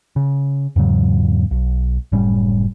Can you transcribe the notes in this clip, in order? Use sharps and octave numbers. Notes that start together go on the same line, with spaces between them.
C#3
E2 G#2 C#3 F#3
B1
F#1 A2 G3 C#4